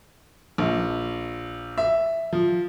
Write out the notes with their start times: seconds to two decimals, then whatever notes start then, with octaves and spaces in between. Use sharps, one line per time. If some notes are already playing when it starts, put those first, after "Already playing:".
0.58 A#1
1.78 E5
2.33 F3